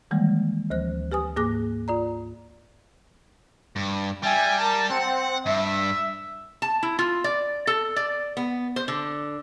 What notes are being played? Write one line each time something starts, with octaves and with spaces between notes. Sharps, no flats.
D#3 E3 G3 G#3 A#3
D2 F3 C5 F#6
G4 B4 G#5 D#6
G#2 A#3 G#4 D6 F#6 A#6
F4 D5 A#5
G2
G3 E5 G5 G#5
A#4 A5
C4 F#5
G2 E5
A5
E4
F4
D5
A4
D5
B3
C5
D3